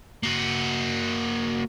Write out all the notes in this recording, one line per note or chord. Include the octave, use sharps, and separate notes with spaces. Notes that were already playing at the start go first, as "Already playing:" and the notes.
A#3 F#4